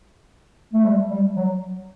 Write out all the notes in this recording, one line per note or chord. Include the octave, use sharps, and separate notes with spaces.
A3
G3
G3
F#3